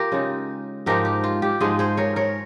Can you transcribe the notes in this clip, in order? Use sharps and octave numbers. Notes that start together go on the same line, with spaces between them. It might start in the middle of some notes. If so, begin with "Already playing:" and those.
Already playing: F4 G4 A#4
C#3 G#3 D#4
G#2 F3 G#3 D#4 G4 A#4
G4
F4
G4
G#2 F3 G#3 D#4 F4 G#4
G#4 C5
A#4 C#5
A#4 C#5